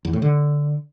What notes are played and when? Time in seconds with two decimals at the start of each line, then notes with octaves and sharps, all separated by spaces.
0.05 E2
0.13 A2
0.22 D3